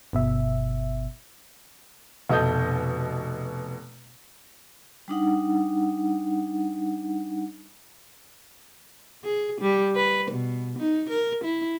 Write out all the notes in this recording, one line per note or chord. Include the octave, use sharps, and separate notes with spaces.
G1 B2 E5
F1 B2 A4 D#5 D#6 G6
G3 D4 D#4 F#5
G#4
G3
B4
B2
D#4
A#4
E4